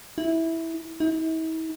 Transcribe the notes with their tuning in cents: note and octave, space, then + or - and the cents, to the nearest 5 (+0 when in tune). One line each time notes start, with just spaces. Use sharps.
E4 -10
E4 -45